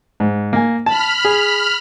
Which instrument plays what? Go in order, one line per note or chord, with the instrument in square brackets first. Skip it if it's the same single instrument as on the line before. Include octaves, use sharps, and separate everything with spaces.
[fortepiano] G#2
A#3 G#5
[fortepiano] A5 [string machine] B5 F6
[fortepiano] G#4